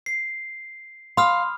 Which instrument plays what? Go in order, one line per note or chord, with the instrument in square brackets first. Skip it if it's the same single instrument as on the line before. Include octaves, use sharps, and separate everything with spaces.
[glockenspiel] C7
[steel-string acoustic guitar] F5 [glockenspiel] B5 D#6 F6 [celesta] C6